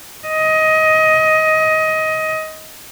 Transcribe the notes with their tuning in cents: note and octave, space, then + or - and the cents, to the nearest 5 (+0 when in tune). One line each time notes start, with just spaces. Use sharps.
D#5 +20